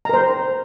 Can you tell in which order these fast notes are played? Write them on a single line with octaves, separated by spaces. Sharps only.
A#5 A#4 C5